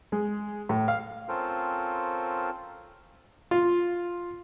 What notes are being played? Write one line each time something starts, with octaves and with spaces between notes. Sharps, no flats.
G#3
A2
F5
C4 C#4 F4 A4 A#4 C5
F4